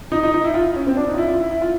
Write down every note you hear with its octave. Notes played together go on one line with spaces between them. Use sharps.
D#4
D#4
D#4
E4
F4
C#4
C4
D4
D#4
F4
E4
F4
E4
E4
F4